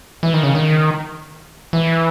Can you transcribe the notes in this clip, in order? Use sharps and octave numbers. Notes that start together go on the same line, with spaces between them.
E3
D#3
C#3
D#3
E3